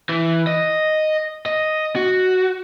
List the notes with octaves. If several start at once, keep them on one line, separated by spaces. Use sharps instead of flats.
E3
D#5
D#5
F#4